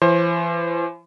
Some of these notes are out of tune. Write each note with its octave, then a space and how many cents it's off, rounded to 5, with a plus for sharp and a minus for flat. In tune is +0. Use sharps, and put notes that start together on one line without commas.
E3 +40 C5 +25